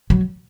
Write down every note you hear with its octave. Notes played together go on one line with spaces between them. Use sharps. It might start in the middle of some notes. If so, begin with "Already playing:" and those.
F#3